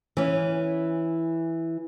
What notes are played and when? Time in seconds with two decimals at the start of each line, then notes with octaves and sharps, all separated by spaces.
0.17 E3 C#4